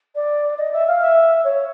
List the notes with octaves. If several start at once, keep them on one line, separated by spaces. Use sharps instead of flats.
D5
D#5
E5
F5
E5
C#5